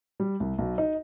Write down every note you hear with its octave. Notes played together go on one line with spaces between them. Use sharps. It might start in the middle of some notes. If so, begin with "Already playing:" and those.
G3
C2
B1
D#4